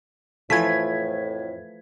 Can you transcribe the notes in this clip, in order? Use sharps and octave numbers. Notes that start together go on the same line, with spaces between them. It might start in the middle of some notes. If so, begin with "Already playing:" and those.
F2 A2 E3 F3 A3 G#6 B6